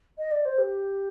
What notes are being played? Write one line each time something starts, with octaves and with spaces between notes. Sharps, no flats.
D#5
D5
C5
G4